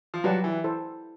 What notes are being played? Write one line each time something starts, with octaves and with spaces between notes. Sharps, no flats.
F3
F#3 G4 B4 D5 F#5 A5
E3
E4 A4 C5